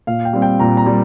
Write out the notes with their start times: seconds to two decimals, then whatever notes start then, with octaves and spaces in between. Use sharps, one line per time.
0.07 A#2 F5
0.25 G5
0.33 G3 C4
0.42 G5
0.59 A#2 A#5
0.77 A#5
0.86 G3